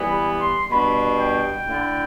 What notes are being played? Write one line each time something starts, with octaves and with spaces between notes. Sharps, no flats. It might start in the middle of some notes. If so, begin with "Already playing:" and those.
Already playing: E3 G3 B3
B5
C6
B2 G3 D4 B5
G5
D3 A3 E4